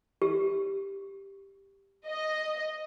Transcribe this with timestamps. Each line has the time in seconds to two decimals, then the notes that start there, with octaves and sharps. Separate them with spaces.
0.22 G4
2.06 D#5